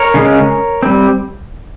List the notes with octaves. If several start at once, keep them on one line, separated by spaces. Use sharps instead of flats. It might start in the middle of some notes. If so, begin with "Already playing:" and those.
Already playing: A#4 C#5
C#3 G#3 C#4
G3 C4